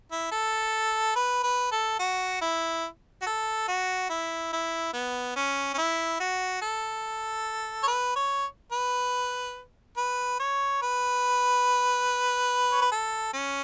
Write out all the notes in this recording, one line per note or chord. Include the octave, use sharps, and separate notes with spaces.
E4
A4
B4
B4
A4
F#4
E4
F#4
A4
F#4
E4
E4
B3
C#4
C#4
E4
F#4
A4
C#5
B4
C#5
B4
B4
C#5
B4
C#5
B4
A4
C#4